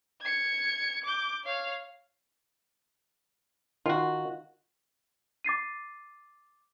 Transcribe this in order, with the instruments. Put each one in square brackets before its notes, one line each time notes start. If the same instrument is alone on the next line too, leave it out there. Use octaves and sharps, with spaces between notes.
[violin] G#6 C#7
D6 G6
C#5 F5
[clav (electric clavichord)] D#3 [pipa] F4 F#4
[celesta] D6 A6 C7 D#7